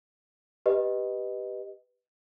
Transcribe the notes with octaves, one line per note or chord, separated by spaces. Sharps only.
G4 B4 D#5